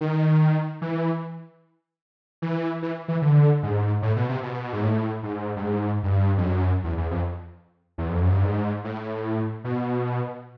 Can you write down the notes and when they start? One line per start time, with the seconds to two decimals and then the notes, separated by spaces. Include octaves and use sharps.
0.01 D#3
0.82 E3
2.42 E3
2.82 E3
3.08 E3
3.22 D3
3.63 G#2
4.02 A2
4.17 B2
4.29 C3
4.43 B2
4.73 G#2
4.83 A2
5.23 G#2
5.57 G2
5.63 G#2
6.03 G2
6.38 F2
6.43 F#2
6.84 E2
6.97 E2
7.11 F2
7.98 E2
8.09 F2
8.21 F#2
8.33 G2
8.44 G#2
8.84 A2
9.64 B2